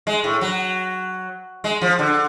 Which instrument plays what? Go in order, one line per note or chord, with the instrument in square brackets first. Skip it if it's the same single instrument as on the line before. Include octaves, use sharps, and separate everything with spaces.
[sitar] G#3
A2
F#3
G#3
F3
D3